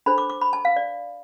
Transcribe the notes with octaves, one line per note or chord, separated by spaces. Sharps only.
D4 A4 C5 B5
D6
D6
B5
A5
F5
D5